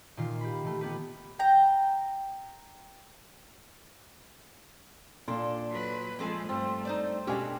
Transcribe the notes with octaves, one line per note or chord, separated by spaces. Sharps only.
A#2 D#3 F4
G4 B5
D#3 A3
B3 G4 B4
G5 A#5
A#2 D4 A4 C6
F#3 B4
F3 G#3 C4 A4 G#5
G2 A3 C4 F4 A4
D#4 C5 D5
B2 G#3 C#4 D4 G4 A4 G#5